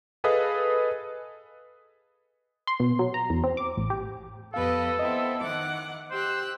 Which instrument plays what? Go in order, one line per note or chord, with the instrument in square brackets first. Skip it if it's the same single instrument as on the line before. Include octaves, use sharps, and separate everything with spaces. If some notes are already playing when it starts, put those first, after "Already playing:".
[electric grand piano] G#4 A4 B4 D#5 F5 D#6
[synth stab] C6
B2
F#3
A#5
E2
C4
D6
A1
G4
[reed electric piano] F2 B3 F5 [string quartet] G4 B4 D#5 [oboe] A4
[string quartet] B3 C4 E4 [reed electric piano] D#5
[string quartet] D#3 F#5 D6
[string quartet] G4 E6 F#6 [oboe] C5